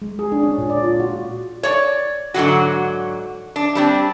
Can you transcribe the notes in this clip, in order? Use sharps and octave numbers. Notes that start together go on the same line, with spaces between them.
G#3
G#4
D4
C#4
A#2
D5
F4
F#4
C#5 D5
G#2 D3 F#3 F#4
D4
G3 C4 D4